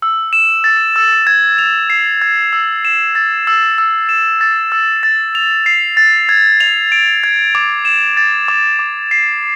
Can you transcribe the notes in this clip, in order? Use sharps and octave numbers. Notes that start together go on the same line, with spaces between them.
E6
E7
A6
E6
G#6
F7
C7
G#6
E6
E7
A6
E6
E6
E7
A6
E6
A6
F7
C7
A6
G#6
F7
D7
G#6
D6
E7
A6
D6
D6
C7